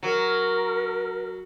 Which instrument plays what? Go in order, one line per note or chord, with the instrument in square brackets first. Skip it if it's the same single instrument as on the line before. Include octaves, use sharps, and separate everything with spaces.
[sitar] F#3 [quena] A#4